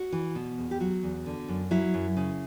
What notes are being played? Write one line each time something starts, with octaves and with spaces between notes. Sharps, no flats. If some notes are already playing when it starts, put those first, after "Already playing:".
Already playing: F#4
E3
B2
E2
G4
F#3 F#4
E2
D3
F#2
F#3 E4
F#2
C#3